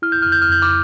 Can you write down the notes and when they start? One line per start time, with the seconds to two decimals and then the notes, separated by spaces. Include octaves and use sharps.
0.02 E4 F6
0.12 G6
0.22 F2 F6
0.32 G6
0.42 F6
0.50 F2 G6
0.62 D6 F6